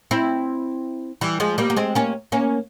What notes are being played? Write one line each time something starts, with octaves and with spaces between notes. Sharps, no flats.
C4 E4
E3 G3
F3 G#3
G3 A#3
A#3
G#3 C4
A#3 C#4
A#3 C#4